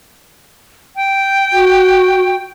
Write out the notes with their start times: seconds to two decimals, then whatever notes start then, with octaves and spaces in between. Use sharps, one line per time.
0.96 G5
1.53 F#4